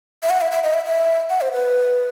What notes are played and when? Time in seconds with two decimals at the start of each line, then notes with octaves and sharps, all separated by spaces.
0.23 E5
0.30 F#5
0.41 E5
0.51 E5
0.63 D#5
0.74 E5
0.85 E5
1.30 F#5
1.41 C5
1.52 B4